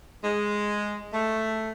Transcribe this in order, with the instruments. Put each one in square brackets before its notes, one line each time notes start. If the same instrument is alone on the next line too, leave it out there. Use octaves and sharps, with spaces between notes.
[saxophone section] G#3
A3